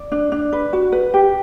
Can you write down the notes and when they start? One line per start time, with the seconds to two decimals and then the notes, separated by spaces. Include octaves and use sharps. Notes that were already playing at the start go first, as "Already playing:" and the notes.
Already playing: D5
0.12 D4
0.32 D4
0.53 B4
0.73 F#4
0.92 B4
1.14 G4